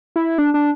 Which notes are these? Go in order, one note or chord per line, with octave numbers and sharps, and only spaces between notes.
E4
D4
D4